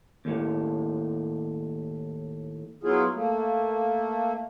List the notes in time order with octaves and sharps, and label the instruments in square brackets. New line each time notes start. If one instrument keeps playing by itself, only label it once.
[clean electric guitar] D#2 A2
[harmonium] F#3 B3 E4 F4 G#4
A3 A#3